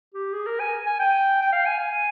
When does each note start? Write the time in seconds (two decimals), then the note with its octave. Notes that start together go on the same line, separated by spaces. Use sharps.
0.14 G4
0.33 G#4
0.46 A#4
0.60 G#5
0.86 G#5
0.99 G5
1.42 G5
1.52 F5
1.66 G#5
1.79 G#5